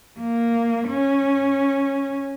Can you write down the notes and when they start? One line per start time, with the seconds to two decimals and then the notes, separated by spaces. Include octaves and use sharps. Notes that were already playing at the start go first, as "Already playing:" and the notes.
0.20 A#3
0.89 C#4